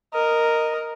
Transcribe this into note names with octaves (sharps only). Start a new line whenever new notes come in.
A#4 D#5